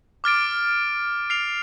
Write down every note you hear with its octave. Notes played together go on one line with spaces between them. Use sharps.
D6 F6 A6 D7
F6 C7 F7